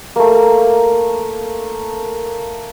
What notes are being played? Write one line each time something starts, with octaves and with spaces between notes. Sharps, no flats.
A3 A#3